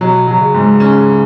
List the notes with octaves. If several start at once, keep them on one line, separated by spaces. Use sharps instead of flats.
B2 F#3
F#3
C#3
G#2
C#4